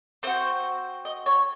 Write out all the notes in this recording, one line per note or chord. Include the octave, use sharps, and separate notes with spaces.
C4 D#4 F#4 C5
D#5
C#5